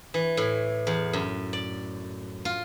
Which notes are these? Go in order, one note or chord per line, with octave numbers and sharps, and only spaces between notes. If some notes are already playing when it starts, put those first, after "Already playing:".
E3
A2
E2
F#2
D5
F4